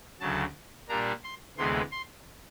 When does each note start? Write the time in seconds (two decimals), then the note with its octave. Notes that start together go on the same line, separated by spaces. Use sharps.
0.20 D2 C#3 F#3 A5
0.89 A#2 G3 A#3 D4 A#5
1.24 C6
1.57 D2 C3 E3 G#3 B3 C6
1.91 C6